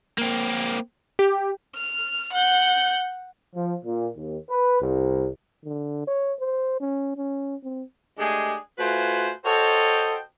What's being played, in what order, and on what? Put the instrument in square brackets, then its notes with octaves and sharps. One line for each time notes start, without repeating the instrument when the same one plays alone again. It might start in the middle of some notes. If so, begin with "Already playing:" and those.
[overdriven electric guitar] A#3 C4
[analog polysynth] G4
[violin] F6
F#5 G6
[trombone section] F3
A#2
D#2
B4
C2
[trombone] D3
C#5
C5
C#4
C#4
C4
[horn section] G#3 A3 D4 G4 G#4
A3 F4 F#4 B4 C5 G#5
F#4 A4 C5 C#5 D#5 G5